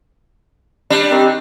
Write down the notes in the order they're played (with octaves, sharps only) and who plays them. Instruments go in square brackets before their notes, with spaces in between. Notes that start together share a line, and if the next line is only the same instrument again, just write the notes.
[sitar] G3 D4
[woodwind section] D#3 C4 D#4